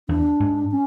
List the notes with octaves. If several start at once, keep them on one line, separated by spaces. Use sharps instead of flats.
E2 D4
G#2
C#4